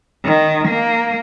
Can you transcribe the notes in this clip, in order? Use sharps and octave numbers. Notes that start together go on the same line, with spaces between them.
D#3
A#3